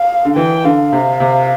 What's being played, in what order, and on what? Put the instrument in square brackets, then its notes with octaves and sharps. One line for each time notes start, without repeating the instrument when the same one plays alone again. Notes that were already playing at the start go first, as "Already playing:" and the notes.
Already playing: [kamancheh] F5
[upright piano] D3
[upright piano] E3 [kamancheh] G5
[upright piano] D3 [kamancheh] F5
[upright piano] C3
C3